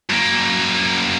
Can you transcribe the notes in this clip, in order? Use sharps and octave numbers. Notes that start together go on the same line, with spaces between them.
F#2 A#3